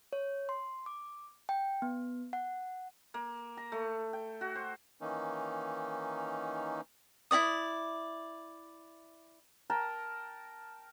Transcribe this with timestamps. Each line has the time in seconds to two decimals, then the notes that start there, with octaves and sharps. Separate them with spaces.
0.13 C#5
0.49 C6
0.86 D6
1.49 G5
1.82 B3
2.33 F#5
3.14 A#3
3.57 A#5
3.72 A3
4.13 G5
4.41 F#4
4.55 C5
5.01 D#3 E3 A#3 C#4 D#4
7.31 E4 F#4 D5 D#6
9.70 A#4 G5 A5 A#5